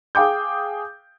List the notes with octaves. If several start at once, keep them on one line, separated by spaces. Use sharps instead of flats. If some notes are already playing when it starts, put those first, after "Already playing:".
G#4 F5 G5 D6 G6